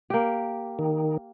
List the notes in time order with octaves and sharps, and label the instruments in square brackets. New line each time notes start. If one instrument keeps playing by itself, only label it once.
[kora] A#3 G4
[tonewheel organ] D#3